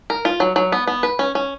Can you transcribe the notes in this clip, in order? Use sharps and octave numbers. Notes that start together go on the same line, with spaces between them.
A#4
F4
F#3
F#3
B3
B3
B4
C#4
C#4